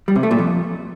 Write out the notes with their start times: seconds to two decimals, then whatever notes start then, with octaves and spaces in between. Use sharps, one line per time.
0.08 G3
0.16 C3
0.23 A3
0.31 A#2
0.38 F2